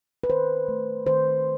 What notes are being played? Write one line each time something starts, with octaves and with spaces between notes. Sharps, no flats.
B4
D#3 C5
A3
D#3 C5